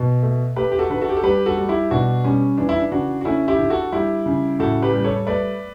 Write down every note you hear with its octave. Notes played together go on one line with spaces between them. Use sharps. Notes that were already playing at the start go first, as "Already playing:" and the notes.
Already playing: B2
A3
A3 G4 B4
G4
F#4 A4
D3 B4
F#4 A4
G4
A4
G3 G4 B4
F#4 A4
G3
E4 G4
B2 D4 F#4
G3 C#4
E3 D4
E4
D4
C#3 D4 F#4
F#4
A3 C#4 E4
E4 G4
D3
F#4 A4
G3 E4 G4
C#3
A2 F#4 A4
G4 B4
G3
A4 C#5
A3 B4 D5